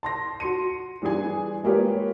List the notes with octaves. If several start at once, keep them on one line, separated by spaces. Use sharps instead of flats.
A5 C6 A#6
F#4 C6 C#7 D#7
E3 G3 D4 G#4 G#5
G#3 A#3 F4 G4 B4 C#5